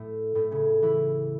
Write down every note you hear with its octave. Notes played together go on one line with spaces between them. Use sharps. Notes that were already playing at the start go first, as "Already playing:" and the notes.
Already playing: A2 A3
A2 A3
C#3 C#4
E3 E4